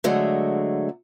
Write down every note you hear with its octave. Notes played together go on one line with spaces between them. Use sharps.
D3 F#3 G#3 A3